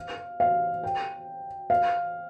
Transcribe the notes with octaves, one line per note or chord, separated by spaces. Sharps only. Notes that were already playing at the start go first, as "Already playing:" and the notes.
Already playing: F5
F5
G5
F5